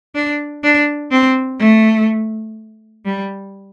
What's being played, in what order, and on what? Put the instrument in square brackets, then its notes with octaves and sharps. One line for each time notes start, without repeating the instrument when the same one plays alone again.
[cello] D4
D4
C4
A3
G3